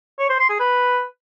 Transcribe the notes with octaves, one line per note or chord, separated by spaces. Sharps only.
C#5
C5
C6
G#4
B4